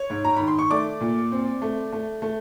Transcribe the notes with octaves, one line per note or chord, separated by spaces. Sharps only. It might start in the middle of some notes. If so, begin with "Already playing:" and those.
Already playing: C#5
G#2
A#5
D#3 B5
C6
C#6
A3 D5 D6
A#2
C4
A3
A3
A3